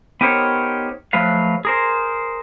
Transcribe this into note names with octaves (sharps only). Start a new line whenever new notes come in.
B3 D#4 G4 A#4 C5 C#5
F3 F#3 A3 B4 F5
G#4 A#4 C5